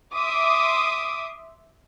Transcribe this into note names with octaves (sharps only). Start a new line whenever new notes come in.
E5 C6 D6 D#6